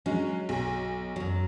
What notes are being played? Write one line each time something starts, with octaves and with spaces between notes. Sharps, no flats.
F#3 G#3 C#4
B1
F#2 F#3